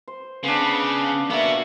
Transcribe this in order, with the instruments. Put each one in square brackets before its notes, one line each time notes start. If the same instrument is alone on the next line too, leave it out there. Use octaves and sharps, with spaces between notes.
[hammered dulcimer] C5
[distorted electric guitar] C#3 [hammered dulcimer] B3 D4
[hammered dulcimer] A#3 E5 [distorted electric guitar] B3 F#4